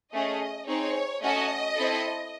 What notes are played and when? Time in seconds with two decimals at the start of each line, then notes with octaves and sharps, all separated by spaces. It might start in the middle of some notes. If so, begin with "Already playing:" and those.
0.12 A3 C#4 G#4 D#5
0.67 C4 D#4 G#4 C#5
1.21 A3 C#4 F#4 A4 D#5
1.75 C4 E4 A4